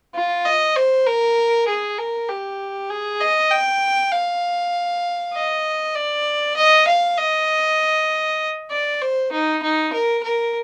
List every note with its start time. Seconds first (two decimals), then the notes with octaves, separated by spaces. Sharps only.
0.15 F4
0.45 D#5
0.76 C5
1.07 A#4
1.68 G#4
1.98 A#4
2.29 G4
2.90 G#4
3.21 D#5
3.51 G5
4.12 F5
5.34 D#5
5.95 D5
6.57 D#5
6.88 F5
7.18 D#5
8.71 D5
9.02 C5
9.32 D#4
9.63 D#4
9.93 A#4
10.24 A#4